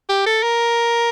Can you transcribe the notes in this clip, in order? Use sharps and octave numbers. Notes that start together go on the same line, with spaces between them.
G4
A4
A#4